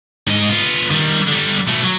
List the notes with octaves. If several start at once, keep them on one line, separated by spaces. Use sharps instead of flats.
G#2 D#5
B3 F4
D#3 G3
D3 G3
B2 A3
F#3